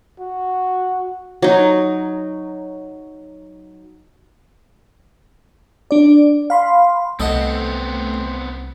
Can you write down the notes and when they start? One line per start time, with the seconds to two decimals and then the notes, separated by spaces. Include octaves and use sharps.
0.20 F#4
1.42 F#3 D#4
5.91 D4 D5
6.50 F5 B5 C6
7.20 C2 A3 B3 C4 A4 D#5 F#5